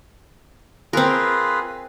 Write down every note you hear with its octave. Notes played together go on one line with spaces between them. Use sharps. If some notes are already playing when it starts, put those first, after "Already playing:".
C4 F4 G#4 A#4 B4